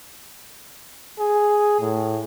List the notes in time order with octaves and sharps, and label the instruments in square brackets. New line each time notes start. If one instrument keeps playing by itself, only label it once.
[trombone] G#4
A2